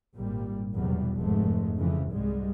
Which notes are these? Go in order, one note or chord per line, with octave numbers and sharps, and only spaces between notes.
G#1 A#2 G3
F1 E2 B2 F#3 G3
F1 G#2 G#3 A3
F2 C#3 E3 F3
C2 G#2 G3 G#3